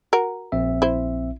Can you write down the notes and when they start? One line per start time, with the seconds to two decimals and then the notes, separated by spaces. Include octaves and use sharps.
0.13 F#4 A#4
0.52 A#1 C4 E5
0.82 E4 C5